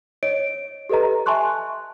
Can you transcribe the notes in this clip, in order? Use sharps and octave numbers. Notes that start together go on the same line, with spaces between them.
C#5 D#5 D7
G4 A4 B4 D#5 A#5
E5 G#5 A5 C6 C#6 F#6